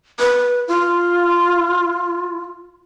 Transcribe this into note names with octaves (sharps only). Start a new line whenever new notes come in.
B4
F4